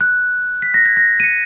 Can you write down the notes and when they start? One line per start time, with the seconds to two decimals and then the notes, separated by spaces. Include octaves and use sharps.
0.01 F#6
0.62 B6
0.74 A#6
0.85 G#6
0.97 A#6
1.20 D#7
1.24 C#7